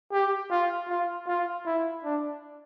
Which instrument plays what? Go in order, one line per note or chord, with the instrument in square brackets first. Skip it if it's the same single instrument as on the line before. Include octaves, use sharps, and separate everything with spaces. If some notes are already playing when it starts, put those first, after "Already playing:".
[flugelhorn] G4
F4
F4
F4
E4
D4